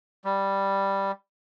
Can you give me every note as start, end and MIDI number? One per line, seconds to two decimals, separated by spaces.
0.25 1.12 55